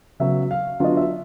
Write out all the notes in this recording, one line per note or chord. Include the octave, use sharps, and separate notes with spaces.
C#3 F#3 B3 E5
F5
D3 F#3 B3 D4 F4 D#5
E5